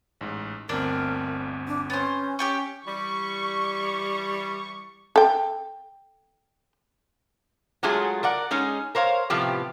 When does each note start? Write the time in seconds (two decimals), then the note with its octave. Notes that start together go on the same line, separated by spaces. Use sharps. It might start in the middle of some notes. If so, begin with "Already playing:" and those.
0.21 A1 G#2
0.69 G1 D2 C4 D4 A#4
1.67 D4
1.90 B3 C#4 C5
2.39 C#4 G4 G5 C#6
2.86 E3 G3 C#6
5.16 A4 G5
7.83 F#3 G#3 A3 F4 G#4
8.23 A#4 D5 F#5
8.51 G#3 C#4 D#4 G#4
8.95 A#4 C5 C#5 F5
9.30 A2 C3 F3 B3 G4